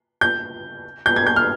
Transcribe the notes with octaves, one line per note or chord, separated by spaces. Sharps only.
G6
G6
G#6
G6
F6